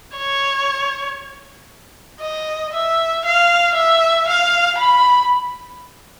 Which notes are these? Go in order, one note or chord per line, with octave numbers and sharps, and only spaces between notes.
C#5
D#5
E5
F5
E5
F5
B5